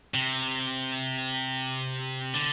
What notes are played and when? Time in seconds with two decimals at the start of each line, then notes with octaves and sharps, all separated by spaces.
0.14 C3
2.34 D3